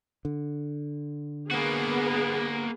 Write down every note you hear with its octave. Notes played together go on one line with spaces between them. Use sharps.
D3
A#3 B3 F#4 G#4